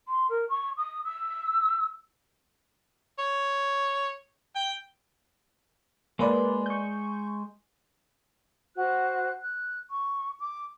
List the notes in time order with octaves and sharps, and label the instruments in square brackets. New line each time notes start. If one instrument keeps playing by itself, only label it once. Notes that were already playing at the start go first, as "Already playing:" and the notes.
[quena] C6
A#4
C#6
D#6
E6
[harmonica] C#5
G5
[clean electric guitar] G#3 [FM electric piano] A#3 B4 D5
[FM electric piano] C#6 G6
[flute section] F#4 C5 F#6
F#6
C#6
D6